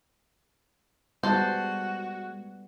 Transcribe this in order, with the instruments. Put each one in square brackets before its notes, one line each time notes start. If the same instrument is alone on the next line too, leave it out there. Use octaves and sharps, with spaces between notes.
[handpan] G3 B3 [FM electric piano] G#3 [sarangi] F#4 [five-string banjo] A4 C5